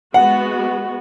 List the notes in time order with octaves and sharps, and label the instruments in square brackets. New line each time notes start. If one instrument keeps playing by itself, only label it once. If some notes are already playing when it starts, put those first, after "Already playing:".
[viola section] G#3 B3 F#4 [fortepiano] F#5